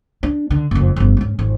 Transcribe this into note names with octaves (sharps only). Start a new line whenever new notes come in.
D4
D3
F#1 F2
G1 F2
G#2 C#4
G#1 F2